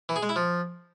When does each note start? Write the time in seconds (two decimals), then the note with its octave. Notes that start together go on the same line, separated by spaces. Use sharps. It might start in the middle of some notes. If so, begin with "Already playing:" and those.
0.09 E3
0.16 G#4
0.23 G#3
0.29 E4
0.36 F3